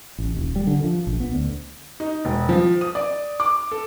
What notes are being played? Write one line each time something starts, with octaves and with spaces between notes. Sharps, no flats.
A1
D#1
G3
D3
F3
A#1
B3
D2
D#4
E1
F3
D#6
D5
D6
A4